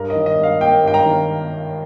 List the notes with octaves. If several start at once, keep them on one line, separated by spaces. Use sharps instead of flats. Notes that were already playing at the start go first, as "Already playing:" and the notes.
Already playing: G2 A#4
D#5
D#3
D#5
G2 F5
A#3 G5
G2 G5
A#5
D#3